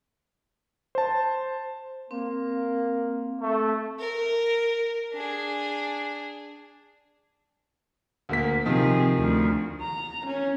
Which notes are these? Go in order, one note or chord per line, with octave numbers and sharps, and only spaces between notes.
C5 A5
A#3 C4
A3
A#4
D4 G#4
D2 A#3 B6
C3 D#3 F3 G#4
D2
A#5
C#4